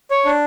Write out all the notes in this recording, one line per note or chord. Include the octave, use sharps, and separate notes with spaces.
C#5
D4